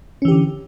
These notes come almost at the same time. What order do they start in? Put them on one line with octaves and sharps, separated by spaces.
C#4 E3 G4 D3